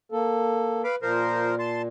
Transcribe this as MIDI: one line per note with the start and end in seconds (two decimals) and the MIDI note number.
0.12 0.82 58
0.12 0.82 69
0.84 0.96 71
0.84 0.96 77
0.84 0.96 83
0.84 0.96 86
1.02 1.88 46
1.02 1.55 53
1.02 1.55 70
1.02 1.55 72
1.59 1.82 81
1.59 1.82 84